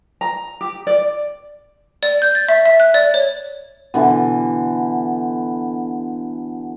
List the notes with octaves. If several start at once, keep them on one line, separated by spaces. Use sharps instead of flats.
A#5
G4
D5
D5
G6
A6
E5
E5
F#6
D5
C#5
B2 D3 E3